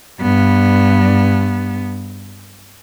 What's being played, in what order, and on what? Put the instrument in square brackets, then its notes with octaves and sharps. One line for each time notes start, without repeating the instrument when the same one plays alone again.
[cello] G2 B3